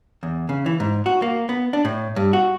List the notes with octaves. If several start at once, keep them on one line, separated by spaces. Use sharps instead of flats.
E2
C#3
E3
G#2
F#4
A#3
B3
D4
A2
G2
F#4